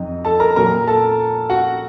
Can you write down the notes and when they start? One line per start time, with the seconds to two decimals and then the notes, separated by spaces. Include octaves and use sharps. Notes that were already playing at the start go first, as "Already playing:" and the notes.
Already playing: F2 C3 F#3 D#4
0.25 A4 A5
0.40 A#4 A#5
0.56 A#2 F#3 A#4 A#5
0.87 A4 A5
1.50 F#4 F#5